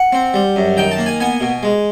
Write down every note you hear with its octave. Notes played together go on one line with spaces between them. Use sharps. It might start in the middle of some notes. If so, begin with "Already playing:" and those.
Already playing: F#5
C4
G3
F#2
D#3 G5
A5
A#3
G#5
B3 G#5
B2
G#3